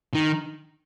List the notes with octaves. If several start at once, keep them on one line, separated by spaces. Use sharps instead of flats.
D#3